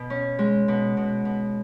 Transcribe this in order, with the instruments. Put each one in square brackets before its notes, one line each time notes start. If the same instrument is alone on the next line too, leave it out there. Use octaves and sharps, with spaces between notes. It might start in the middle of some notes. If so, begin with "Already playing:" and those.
Already playing: [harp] B2
C#4
G#3
B2
B2
B2